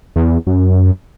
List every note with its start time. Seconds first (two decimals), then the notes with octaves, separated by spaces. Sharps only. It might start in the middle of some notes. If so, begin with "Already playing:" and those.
0.16 E2
0.47 F#2